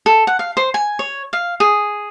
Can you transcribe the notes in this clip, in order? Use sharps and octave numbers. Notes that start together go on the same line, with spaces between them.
A4
F#5
F5
C5
G#5
C#5
F5
G#4